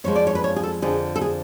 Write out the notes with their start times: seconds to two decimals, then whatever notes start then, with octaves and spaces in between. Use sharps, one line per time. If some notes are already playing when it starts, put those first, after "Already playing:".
0.04 F2 F3 G#3 C#5
0.15 D5
0.27 C#5
0.35 B4
0.44 C#5
0.56 G#4
0.63 A4
0.82 F2 D3 F3 G#4
1.16 A4
1.21 G#4